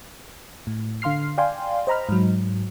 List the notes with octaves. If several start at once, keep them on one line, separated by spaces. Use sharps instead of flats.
A2
D3 F5 C6 F6 C7
D5 F5 G5 G#5 C6
C5 D#5 A#5 B5 F6
G#2 F#3